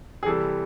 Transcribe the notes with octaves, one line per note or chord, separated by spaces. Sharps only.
G#4
C3 E3 G3 A4